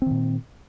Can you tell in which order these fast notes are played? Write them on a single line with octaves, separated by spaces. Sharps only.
C4 D#3 A#2